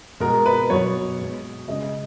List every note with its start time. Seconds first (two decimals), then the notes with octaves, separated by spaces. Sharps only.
0.20 B2 G#3 A#4
0.46 B4
0.70 B2 F#3 C#5
1.19 B2 G#3
1.68 C#3 G#3 D#5